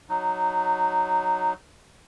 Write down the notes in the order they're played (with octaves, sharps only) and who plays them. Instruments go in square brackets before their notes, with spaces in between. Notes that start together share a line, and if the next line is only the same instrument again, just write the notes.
[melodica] F#3 D#4